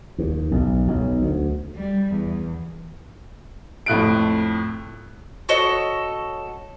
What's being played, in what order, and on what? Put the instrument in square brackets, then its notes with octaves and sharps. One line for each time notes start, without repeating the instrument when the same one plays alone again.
[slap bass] D#2
B1
B1
D2
[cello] G3
E2
[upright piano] F2 A2 F#6 D7
[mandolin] F#4 A4 C#5 D#5